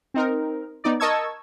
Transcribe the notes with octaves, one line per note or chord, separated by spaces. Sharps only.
C4 D#4 A#4
B3 D#4 D5
A#4 D#5 A5 C#6 E6 G#6